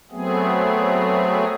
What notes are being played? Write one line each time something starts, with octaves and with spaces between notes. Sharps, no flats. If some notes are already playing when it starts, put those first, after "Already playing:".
F#3 A3 B3 C4 G#4